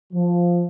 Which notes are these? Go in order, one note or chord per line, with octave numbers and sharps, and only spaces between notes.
F3